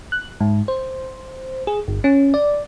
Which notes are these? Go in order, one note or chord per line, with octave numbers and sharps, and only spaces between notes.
F#6
G#2
C5
G#4
G1
C#4
D5